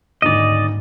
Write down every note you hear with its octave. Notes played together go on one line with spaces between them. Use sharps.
D#1 D2 G#2 D#4 D5 D#5